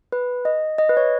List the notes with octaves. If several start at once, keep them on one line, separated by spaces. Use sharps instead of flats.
B4
D#5
D#5
B4
C#5